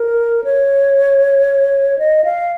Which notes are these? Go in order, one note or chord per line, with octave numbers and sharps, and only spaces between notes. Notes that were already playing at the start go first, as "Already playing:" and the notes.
Already playing: A#4
C#5
D#5
F5